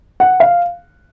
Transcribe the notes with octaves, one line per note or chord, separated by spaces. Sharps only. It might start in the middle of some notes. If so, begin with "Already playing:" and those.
F#5
F5